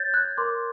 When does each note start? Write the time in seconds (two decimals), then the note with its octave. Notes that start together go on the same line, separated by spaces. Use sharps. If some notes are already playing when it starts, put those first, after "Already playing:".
Already playing: C#5 G6 A6
0.14 F#6 G#6
0.38 A#4 C6 D6